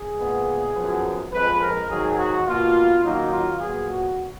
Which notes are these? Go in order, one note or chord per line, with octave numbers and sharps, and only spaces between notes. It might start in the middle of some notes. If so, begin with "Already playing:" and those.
Already playing: G#4
A#2 G#3 B3
F#2 F3 B3
F2 F3 G#3 B4
A#4
G#2 D#3 F#3 G#4
F#4
B2 A#3 F4
F#2 D#3 F#3 A#3 D#4
F4
A#2 F#3 B3 G#4
F#4